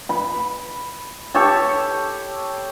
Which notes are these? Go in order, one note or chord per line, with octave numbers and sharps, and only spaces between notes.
B5
G4 A4 C#5 A5